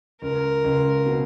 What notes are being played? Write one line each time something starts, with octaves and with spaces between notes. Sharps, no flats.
C#2 A#4
C#2
B2